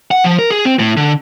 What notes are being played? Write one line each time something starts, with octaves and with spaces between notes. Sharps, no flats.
F#5
F3
A#4
G#4
C4
A2
D3